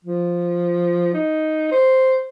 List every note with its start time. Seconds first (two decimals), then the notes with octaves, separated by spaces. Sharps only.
0.05 F3
1.13 D#4
1.72 C5